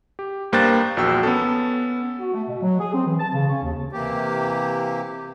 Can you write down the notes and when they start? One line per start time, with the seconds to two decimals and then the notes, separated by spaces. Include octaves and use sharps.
0.19 G4
0.53 G2 A#3 C5 G5 F#6 A6
0.97 A#1 E2 F#4 G5 E6
1.23 B3 C#4 A4
2.19 F#4
2.33 A3
2.48 B2
2.62 F#3
2.79 G#4
2.94 C4
3.06 E3
3.18 A5
3.33 C#3
3.48 C#4
3.62 D#2
3.92 C3 E3 A#3 G4